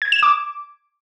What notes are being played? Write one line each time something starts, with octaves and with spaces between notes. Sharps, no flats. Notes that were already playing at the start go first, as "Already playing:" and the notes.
G#6
E7
D6